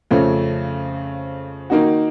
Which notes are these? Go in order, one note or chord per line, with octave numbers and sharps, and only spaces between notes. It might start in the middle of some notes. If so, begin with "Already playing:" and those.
F2 C#3 F3 A3 C#4
D#3 A#3 D#4 F#4